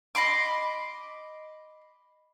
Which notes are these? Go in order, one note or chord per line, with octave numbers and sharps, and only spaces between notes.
D#5 B5 C6 D6